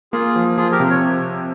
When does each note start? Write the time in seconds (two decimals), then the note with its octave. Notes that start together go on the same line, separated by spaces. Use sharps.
0.12 A#3 F4 G#4
0.36 F3
0.57 F3 F4 G#4
0.72 G4 A#4
0.80 C3
0.90 C#5